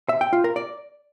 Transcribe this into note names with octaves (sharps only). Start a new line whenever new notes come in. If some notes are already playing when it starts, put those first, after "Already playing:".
E5
G5
F4
A#4
D5